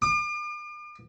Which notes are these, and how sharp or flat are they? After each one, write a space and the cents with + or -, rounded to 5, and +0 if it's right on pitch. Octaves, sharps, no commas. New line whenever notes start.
D6 +45